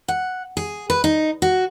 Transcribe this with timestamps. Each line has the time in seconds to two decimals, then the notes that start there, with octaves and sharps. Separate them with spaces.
0.08 F#5
0.57 G#4
0.90 B4
1.04 D#4
1.42 F#4